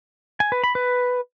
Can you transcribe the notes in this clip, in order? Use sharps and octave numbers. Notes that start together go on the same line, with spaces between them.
G#5
B4
B5
B4